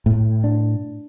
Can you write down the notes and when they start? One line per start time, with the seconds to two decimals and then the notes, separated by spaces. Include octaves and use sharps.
0.06 A2
0.44 D4